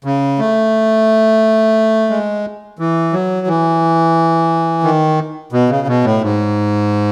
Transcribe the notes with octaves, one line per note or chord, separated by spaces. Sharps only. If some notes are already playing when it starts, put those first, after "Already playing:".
C#3
A3
G#3
E3
F#3
E3
D#3
B2
C#3
B2
A2
G#2